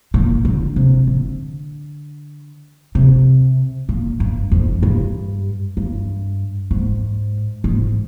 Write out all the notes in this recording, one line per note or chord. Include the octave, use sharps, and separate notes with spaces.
A#2
D3
C3
D3
C3
A#2
G2
F2
G2
G2
G#2
G#2